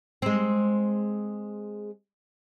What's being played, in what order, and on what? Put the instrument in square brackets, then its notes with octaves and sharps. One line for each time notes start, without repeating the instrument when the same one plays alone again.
[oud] G#3 C4